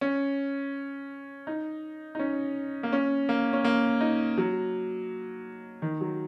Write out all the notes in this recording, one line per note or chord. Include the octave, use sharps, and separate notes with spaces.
C#4
D#4
D#4
C#4
A#3
C#4
A#3
C#4
A#3
D#4
F#3
D#3
F#3